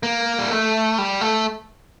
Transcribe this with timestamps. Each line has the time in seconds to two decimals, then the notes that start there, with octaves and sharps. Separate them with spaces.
0.03 A#3
0.39 G3
0.50 A3
0.98 G3
1.21 A3